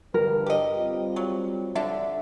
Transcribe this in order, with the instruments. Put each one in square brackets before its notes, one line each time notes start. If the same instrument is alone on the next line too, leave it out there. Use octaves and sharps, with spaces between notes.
[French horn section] G2 D3 B4 [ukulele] A#4
[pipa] G4 D#5
[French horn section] G3 C4 F4
[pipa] F#3
[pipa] D3 D4 [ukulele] E5